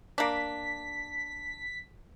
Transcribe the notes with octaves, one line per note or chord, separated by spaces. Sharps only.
A#3 D4 B6